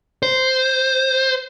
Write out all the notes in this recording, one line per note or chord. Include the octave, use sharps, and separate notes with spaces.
C5